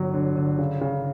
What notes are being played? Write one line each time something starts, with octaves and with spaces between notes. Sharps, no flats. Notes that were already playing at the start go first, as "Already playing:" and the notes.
Already playing: G1 F#3
D3
D3
C#3
C#3